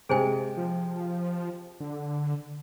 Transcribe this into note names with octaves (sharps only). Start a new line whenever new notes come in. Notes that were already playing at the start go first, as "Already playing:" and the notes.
C3 G#3 G#4 C5 G#5
F3
D3